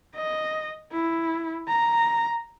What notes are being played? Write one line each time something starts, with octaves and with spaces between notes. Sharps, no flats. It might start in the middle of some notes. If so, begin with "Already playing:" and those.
D#5
E4
A#5